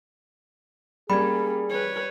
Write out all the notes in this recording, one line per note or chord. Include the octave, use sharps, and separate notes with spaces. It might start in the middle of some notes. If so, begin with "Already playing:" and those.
G3 A#3 C#4 G#4 B5 G#6
B4 C#5